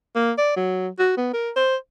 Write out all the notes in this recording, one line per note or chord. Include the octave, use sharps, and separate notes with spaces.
A#3
D5
F#3
F#4
B3
A#4
C5